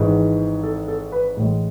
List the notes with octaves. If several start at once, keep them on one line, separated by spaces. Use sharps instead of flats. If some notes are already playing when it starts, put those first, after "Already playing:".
Already playing: G#1 G#2 E3
A4
A4
B4
A1 A2 G#3